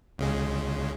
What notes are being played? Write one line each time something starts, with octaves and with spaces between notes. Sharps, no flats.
C#2 C#3 G#3